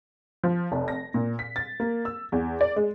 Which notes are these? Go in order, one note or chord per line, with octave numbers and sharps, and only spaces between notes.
F3
F1
A#6
A#2
B6
A6
A#3
E6
E2
D5
G#3